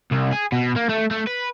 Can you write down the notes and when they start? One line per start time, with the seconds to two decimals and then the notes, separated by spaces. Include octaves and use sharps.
0.12 C2
0.33 G#4
0.52 B2
0.76 A#3
0.89 A3
1.11 A3
1.27 B4